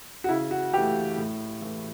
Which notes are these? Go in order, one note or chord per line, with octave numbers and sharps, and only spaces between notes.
F#4
C#3 E4
F#4
E3 A3 G4
A2
E3 A3